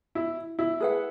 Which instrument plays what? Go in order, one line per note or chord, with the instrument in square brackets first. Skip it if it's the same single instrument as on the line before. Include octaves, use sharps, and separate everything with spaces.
[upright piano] E4
E4
[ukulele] G#4 B4 F#5